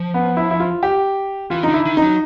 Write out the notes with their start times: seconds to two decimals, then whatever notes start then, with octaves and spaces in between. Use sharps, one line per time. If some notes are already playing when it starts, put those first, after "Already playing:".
Already playing: F3
0.14 B3
0.37 E4
0.51 E4
0.60 F4
0.83 G4
1.50 E3 F4
1.63 D3 D#4
1.74 E4
1.85 D#3
1.97 F#3 D#4